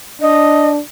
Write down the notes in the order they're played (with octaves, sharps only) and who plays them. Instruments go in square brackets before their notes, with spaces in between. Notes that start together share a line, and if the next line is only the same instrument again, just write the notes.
[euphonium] D4 [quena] D#5